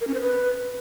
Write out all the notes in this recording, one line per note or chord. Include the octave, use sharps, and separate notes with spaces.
A#4
C#4
C5
B4